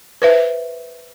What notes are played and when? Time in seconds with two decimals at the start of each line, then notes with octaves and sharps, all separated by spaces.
0.22 B4 C5 E5